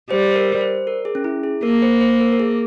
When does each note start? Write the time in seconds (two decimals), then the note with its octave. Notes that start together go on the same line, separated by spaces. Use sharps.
0.10 G3 C5
0.31 C5
0.36 A#4
0.61 C5
0.87 A#4
1.05 G#4
1.15 C#4
1.24 E4
1.43 G#4
1.63 A#3 A#4
1.82 C5
2.01 C5
2.21 A#4
2.32 A#4
2.40 G#4